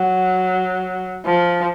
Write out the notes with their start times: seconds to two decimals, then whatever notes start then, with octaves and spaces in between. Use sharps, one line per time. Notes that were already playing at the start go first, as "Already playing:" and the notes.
Already playing: F#3
1.25 F3